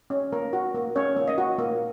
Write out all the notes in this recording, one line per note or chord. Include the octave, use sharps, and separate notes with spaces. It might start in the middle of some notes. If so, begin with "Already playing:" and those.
C#4
A#3 A#4
F#4
A#3
C#4 C#5
A#3
D#5
F#4
A#3